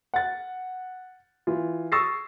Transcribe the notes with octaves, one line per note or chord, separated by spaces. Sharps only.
F#5 A6
E3 F4
C#6 D#6 E6 A6 A#6 C7